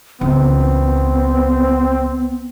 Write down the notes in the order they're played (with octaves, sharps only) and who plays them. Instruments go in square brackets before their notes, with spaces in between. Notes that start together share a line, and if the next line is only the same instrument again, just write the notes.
[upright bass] C#2 E3 [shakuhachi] B3 [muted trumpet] C4